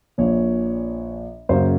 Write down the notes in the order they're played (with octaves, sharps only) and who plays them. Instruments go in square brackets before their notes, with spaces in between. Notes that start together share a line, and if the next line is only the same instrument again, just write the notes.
[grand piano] A#1 A#2 F3 C#5
F#2 C#3 F#3 A#3 C5